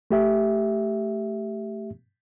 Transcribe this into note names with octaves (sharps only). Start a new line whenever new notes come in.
A3 G4 E5